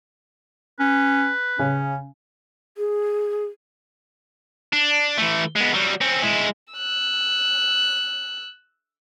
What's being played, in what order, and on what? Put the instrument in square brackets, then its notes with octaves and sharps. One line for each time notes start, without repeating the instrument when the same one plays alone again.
[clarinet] C#4 [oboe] B4
[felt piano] C#3 [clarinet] C#4
[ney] G#4
[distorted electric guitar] D4
E3 A3
G#3 B3
F#3 G3
C4 C#4
G#3 E4
[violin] E6 F#6